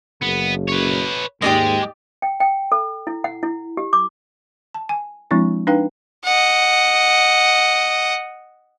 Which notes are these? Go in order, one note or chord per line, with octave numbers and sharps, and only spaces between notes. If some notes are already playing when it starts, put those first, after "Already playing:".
F#1 B3
B4 C#5
D#2 G#2 G#3 G4 D5 D#5
G5
G5
A4
E4
F#5
E4
G4
D6
A5
G#5
F3 G#3 C4 D4 E4
D4 D#4 B4 F5 G5
D#5 F#5